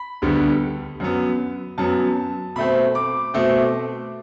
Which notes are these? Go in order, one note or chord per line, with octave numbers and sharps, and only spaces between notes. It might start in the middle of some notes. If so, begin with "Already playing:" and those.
Already playing: B5
D2 D3 G3 B3
F#2 F#3 B3
F#2 F#3 B3 A5
B2 A3 C4 B5
D6
B2 A3 C4